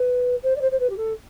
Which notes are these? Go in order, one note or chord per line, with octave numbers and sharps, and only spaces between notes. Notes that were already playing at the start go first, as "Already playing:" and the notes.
Already playing: B4
C5
D5
C5
C5
B4
G4
A4